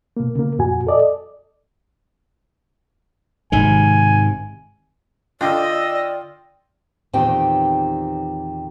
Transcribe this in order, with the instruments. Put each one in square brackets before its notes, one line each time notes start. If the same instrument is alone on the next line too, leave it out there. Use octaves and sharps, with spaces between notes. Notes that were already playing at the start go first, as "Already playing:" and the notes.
[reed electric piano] B2 A#3
C#3 A#3
F2 A#2 F#4 G#5
A4 D5 D#5
[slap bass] G#1 C3 D#3 [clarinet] G#5
[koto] D3 D4 [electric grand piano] F4 G5 [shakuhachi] D5 [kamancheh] D#5 E6
[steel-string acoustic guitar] E2 A#2 D#3 C4 G4 G5